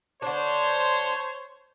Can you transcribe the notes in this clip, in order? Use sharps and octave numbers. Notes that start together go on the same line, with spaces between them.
D3 D4 C5 C#5